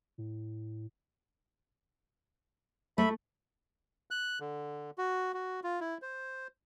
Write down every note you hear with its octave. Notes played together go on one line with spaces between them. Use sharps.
A2
A3 E5 B5
F#6
D3
F#4
F#4
F4
E4
C5